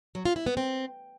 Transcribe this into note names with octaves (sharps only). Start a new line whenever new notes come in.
F#3
F4
E4
B3
C4